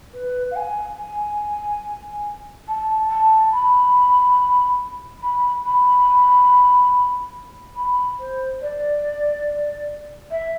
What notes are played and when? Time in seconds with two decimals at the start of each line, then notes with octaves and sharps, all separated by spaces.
0.14 B4
0.51 F5
0.56 G#5
0.98 G#5
2.68 A5
3.10 A5
3.53 B5
5.22 B5
5.65 B5
7.76 B5
8.19 C5
8.61 D5
10.31 E5